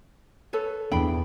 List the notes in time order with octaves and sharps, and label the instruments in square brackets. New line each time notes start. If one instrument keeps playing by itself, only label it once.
[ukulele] A4 B4 C#5
[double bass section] E2 [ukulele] D4 G5 B5